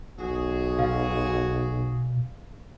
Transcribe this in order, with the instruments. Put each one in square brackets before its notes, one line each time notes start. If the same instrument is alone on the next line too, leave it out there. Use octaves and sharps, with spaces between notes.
[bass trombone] B1 [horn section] F#4 G#4
[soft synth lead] B2 [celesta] F5